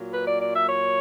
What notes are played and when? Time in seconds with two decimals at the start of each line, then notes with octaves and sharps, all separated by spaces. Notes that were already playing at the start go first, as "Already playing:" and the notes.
Already playing: A#2 F#3
0.14 B4
0.28 D5
0.41 D5
0.56 E5
0.69 C#5